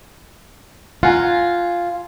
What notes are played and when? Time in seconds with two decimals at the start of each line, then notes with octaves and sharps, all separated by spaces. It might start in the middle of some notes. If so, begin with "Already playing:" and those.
1.03 F4 F#5 G#5 A#5